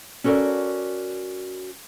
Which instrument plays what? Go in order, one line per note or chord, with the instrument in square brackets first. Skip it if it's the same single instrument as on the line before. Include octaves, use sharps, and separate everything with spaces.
[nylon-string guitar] C#4 F#4 A4 A#4 D5